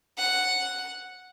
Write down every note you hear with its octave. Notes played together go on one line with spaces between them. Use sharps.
F#5